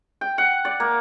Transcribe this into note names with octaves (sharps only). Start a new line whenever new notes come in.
G5
F#5
D5
A#3